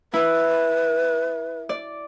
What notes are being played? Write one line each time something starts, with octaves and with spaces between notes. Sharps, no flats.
E4 B4
D5